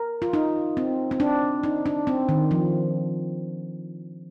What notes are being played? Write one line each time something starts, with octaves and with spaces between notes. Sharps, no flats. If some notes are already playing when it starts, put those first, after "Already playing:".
Already playing: A#4
F4
D#4
C4
C4
D4
D#4
D4
C4
D#3
F3